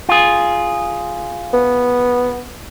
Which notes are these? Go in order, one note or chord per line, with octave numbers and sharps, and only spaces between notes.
F4 G#4
B3